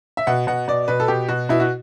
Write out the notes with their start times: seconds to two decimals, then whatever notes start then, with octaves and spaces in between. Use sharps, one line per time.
0.17 E5
0.27 B2 F#5
0.47 B2 F#5
0.68 B2 D5
0.88 B2 B4
1.00 A4
1.08 B2 G4
1.29 B2 F#4
1.49 B2 E4
1.60 F#4